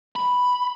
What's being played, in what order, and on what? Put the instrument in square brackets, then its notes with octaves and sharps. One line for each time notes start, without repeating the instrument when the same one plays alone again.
[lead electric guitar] B5